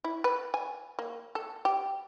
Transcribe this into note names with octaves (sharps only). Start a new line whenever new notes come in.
E4
B4
G#5
A#3
A4
G4